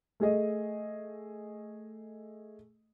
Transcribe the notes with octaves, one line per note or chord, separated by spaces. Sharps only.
A3 G#4 D#5